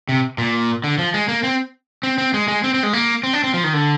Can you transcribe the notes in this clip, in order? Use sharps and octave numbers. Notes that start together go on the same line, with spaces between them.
C3
A#2
D3
F3
G#3
A#3
C4
C4
C4
G#3
G#3
C4
C4
G#3
A#3
C4
D4
C4
F3
D#3
D3